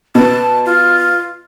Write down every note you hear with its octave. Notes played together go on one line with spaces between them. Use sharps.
B2 B4 D#5 A5
F4